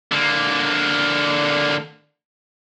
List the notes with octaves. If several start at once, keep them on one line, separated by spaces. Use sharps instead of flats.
D3 A#3